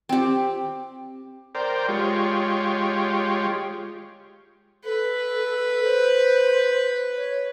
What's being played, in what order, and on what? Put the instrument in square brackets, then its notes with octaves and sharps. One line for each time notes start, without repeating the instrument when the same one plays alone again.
[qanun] C4 G4
[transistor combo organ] A#4 C5 D5 G5
G#3 F4 G4 C#5
[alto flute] A4 [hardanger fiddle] B4
[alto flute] C5
C#5